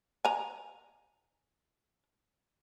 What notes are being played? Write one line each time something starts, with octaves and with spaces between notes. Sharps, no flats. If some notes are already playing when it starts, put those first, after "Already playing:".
G#5 A#5